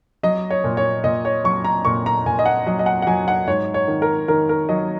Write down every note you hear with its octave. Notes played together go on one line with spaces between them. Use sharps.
F#3 D#5
C#5
A#2
C#5
A#2 D#5
C#5
F#3 C#6
A#5
A#2 C#6
A#5
A#2 G#5
D#5
F#5
F#3 D#5
D#5
F#5
F#5
F#3 G#5
F#5
G#2 C#5
C#5
D#3
A#4
D#3 A#4
A#4
F#3 D#5